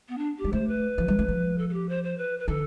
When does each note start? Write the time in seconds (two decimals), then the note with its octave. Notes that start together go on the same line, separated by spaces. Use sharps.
0.08 B3
0.18 D4
0.39 G4
0.44 G3
0.53 A3 C5
0.68 B4
0.98 F3
1.08 G3
1.19 A3
1.28 F3
1.58 A4
1.69 A4
1.73 G4
1.89 C5
2.04 C5
2.18 B4
2.39 B4
2.48 D3 A4